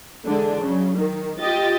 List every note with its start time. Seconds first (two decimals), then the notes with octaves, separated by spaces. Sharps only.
0.25 D3 E3 G#3 D4
0.62 C#3 F#3
0.98 D#3
1.40 F4 G4 D#5 A6